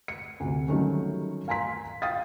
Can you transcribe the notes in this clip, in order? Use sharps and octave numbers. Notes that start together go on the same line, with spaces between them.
C#7
D2 C3
D#3 F#3 G3 A3 C#4
F5 G#5 A#5 C6 B6
F5 G5 D#6 A6